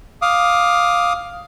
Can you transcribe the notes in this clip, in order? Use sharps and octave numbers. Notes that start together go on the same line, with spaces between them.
F5 D6 D#6